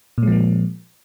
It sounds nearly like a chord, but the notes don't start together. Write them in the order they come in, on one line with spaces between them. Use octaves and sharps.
A#2 G#3 F3 A#3